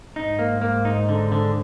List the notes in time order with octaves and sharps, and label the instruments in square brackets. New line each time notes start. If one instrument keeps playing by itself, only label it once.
[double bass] G#2 [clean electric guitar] D#4
[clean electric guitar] A#3
A#3
D#4
D3
D3